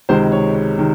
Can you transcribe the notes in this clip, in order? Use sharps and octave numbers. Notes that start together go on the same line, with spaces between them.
C#2 C3 D#3 G#3 C5
C#5
C#5
C3 D#3